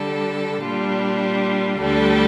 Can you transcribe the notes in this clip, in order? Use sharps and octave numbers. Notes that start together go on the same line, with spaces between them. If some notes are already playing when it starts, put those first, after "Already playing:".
Already playing: D3 G3 D4 A4
A#2 G3 D4 F4
D2 D3 G3 D4 A4